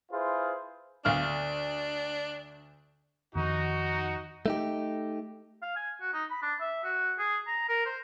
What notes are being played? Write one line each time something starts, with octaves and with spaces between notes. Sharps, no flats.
E4 F4 G#4 B4 C5
D2 D4 F5 F6
F2 D#3 D#4 F#4
A3 D#4 G4
F5
G#5
F#4
D#4
B5
D4
E5
F#4
G#4
A#5
A#4
C5